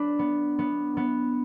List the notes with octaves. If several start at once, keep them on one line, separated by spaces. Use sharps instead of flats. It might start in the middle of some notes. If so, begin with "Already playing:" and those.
Already playing: D4 B4
B3
B3
B3